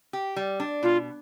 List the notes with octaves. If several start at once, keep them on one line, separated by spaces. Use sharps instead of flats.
G4
G3
D4
B2 F4